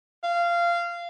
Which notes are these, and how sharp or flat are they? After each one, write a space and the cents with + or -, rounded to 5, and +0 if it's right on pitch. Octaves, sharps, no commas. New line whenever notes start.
F5 -20